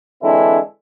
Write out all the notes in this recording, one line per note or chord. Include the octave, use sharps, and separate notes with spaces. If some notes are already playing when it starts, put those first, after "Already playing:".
D3 E3 G#3 C4 D4 E4